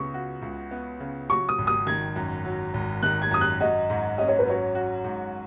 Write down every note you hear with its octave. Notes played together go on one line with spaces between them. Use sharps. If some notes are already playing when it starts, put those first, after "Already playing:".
Already playing: C#2 C#3 B3 C#6
F#4
C#2
B3
C#3
F#3 C#6
D#6
G#1
D#6
D#3 G#6
F#2
F#3
G#1
D#3 F#6
G#6
F#2 D#6
F#6
F#4 D#5
G#2
C#4 D#5
C#5
B4
F#3 C#5
F#4
G#2